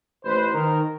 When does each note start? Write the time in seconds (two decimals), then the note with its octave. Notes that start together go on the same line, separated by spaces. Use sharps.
0.25 A1 B4 C5
0.54 D#3 A#4